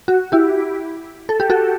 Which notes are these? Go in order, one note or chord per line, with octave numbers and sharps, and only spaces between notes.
F#4
E4 G4
A4
G4
F#4 A4